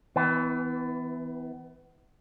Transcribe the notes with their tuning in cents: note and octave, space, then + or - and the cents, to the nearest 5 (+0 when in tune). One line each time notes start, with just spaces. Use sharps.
E3 -20 B3 +30